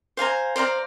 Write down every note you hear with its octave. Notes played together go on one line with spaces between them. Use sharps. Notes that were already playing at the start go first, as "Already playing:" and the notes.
C5 F5 G#5 A#5
C5 D5 F5 A#5